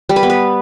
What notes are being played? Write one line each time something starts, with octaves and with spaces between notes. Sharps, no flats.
G3
B4
B3
B4